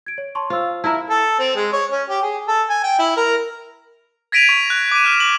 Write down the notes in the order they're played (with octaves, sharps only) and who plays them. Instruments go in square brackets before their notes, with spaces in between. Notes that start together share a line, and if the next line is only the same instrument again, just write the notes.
[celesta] G#6 D7
C#5
A5 C6 C#6
[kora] F4 [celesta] C5 E6
[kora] E4 A#4 E5 [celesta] A5
[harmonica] A4
C4
G#3
C#5
C#4
G4
G#4
A4
G#5
G5
E4
A#4
[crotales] G#6 A#6 B6 D7 D#7 F7
C#6
F#6
D6 D#7
F6 F#6 E7
F#7